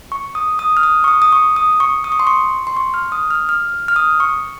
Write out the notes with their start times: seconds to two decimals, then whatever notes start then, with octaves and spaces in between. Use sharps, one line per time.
0.12 C#6
0.35 D#6
0.59 D#6
0.77 F6
0.83 D#6
1.04 C#6
1.08 D#6
1.22 D#6
1.32 C#6
1.56 D#6
1.80 C#6
2.04 D#6
2.12 C#6
2.20 C6
2.27 C#6
2.67 C6
2.77 C#6
2.94 F6
3.12 D#6
3.31 F6
3.49 F6
3.88 F6
3.96 D#6
4.20 C#6